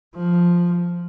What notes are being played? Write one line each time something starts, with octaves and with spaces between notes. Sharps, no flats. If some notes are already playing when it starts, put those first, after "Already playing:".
F3